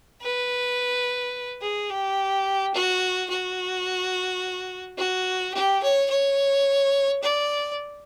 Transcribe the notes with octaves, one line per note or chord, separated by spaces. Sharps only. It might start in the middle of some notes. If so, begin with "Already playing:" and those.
B4
G#4
G4
F#4
F#4
F#4
G4
C#5
C#5
D5